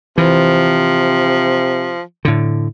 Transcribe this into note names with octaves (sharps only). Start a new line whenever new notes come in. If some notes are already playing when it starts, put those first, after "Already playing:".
C3 E3 F3
A2 D3